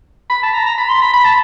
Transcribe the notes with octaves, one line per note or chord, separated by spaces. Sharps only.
B5
A5
A#5
A#5
B5
C6
B5
B5
A5